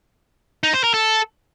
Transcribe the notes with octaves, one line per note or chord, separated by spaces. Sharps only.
D#4
C5
A#4
A4